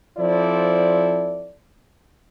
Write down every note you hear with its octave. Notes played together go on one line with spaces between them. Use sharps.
F3 C4 E4 A4 D5